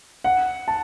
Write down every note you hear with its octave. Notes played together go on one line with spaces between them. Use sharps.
F#5
A5